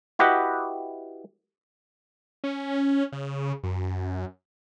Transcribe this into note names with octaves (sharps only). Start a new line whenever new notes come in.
E4 F#4 G4 B4 D#5 F#5
C#4
C#3
F#2